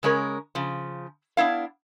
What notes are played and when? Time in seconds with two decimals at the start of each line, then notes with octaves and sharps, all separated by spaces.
0.03 C#3 G#3 C#4 A#4
0.55 C#3 F3
1.37 B3 D4 E4 F5